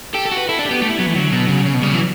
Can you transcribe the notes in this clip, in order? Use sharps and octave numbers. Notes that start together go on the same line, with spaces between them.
G4 A4
A4
F#4
B4
E4 A4
D4
B3 G4
A3 G4
E4
F#3 B3
E3 A3
D3 F#3
B2
C#3
C#3
B2
C#3 G3
E3 F#3